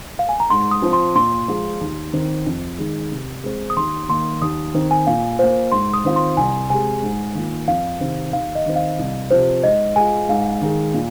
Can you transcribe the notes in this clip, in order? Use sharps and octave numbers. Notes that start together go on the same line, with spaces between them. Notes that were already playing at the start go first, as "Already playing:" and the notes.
F5
G#5
A#5
G#2 C6
D#6
F3 C4
C6
A#2 C6
F3 G#3 F4
D#2
D#3 C4
F2
D#3 G#3 D#4
C3
G#3 C4
D#6
D#2 C6
D#3 A#3 D#4 C6
D#2 D#6
D#3 C4
G#5
A#2 F5
A#3 F4 C5
G#2 C6
D#6
D#3 C4 F4
C6
C2 G#5
C3 G#3 G#5
G#2
D#3 A#3 F4
F2 F5
C3 D#3 C4
D#2 F5
D#5
D#3 C4
F5
C2
C3 F3 C5
G#2 D#5
G#3 F4 G#5
G#2 F5
D#3 G#3
A#2